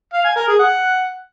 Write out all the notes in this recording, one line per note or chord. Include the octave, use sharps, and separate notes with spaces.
F5
G#5
A#4
G#4
F#5